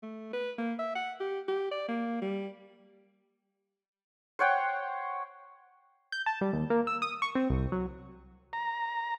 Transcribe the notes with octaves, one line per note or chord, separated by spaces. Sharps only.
A3
B4
A#3
E5
F#5
G4
G4
D5
A#3
G3
C5 C#5 F#5 G5
G6
A5
G3
D#2
A#3
E6
D#6
C#6
C4
C2
F#3
A#5